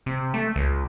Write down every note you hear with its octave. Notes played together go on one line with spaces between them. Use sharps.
C3
A3
C#2